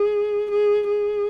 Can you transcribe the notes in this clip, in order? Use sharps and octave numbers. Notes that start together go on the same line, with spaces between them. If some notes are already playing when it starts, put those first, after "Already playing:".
Already playing: G#4
G#4
G#4